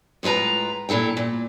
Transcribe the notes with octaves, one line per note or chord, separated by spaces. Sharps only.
A2 G#3 F4 B4 A#5
A#2 E4 A4 G5
A#2